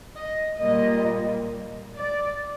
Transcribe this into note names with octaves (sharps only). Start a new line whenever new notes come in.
D#5
A#2 G3 A#3 D#5
D5